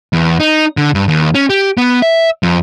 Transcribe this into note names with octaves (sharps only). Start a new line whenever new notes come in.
E2
D#4
D3
G2
D#2
C#4
G4
B3
E5
F2